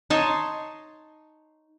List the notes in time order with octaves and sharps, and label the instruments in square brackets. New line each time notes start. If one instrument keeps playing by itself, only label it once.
[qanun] D#4 C#5 A5 C6